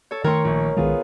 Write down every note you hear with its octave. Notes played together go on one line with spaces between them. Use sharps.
A4 C#5
D#3 A3 A#4 C#5 G5 C6 C#6
A#1
B1 D#3 G#3 B3 F4 G#4